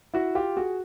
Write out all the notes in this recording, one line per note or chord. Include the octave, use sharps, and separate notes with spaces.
E4 F#4
F4 G4
F#4 G#4